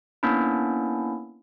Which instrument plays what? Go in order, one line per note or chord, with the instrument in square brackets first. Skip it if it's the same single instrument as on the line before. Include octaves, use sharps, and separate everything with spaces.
[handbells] A#3 B3 C#4 D4 E4